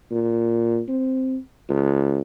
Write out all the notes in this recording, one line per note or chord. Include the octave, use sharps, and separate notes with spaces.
A#2
C4
C#2